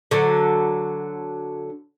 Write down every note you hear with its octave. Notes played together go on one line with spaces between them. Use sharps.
D3 F#3